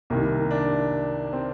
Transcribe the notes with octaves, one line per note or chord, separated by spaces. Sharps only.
C2 C3 D#3 A#3
D4
C4